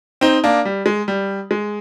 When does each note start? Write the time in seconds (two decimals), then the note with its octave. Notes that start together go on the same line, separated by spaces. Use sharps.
0.21 C4 D#4
0.44 A#3 D4
0.65 G3
0.86 G#3
1.08 G3
1.51 G#3